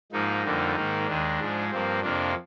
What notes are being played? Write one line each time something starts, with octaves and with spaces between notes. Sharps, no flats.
G#2 F3 A#3 D#4
F2 D3 G3 A#3
G#2 D#3 A#3
D#2 D#3 G#3 D4
G#2 F3 G#3
G2 F3 A#3 C4
F2 C3 F3 A#3 D4